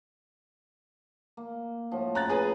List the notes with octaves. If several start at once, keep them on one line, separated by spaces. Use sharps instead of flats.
A#3
A2 F3 F#4
C#3 A#5 F#6 A6
G#4 B4 A#5